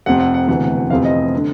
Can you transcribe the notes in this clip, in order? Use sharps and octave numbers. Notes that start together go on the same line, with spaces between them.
F1 F2 C3 F#5
F#5
F#5
E1 D2 C3 E3 F#5
F#5
F#5
F1 F2 C3 E3 F5
D#5
D3